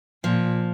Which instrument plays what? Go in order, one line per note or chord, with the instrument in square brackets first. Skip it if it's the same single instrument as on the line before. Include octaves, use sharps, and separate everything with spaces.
[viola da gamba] A#2 [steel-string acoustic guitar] F3